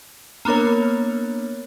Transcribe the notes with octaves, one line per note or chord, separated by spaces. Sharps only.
A#3 B3 D4 A#4 C#5